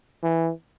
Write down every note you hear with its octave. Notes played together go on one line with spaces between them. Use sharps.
E3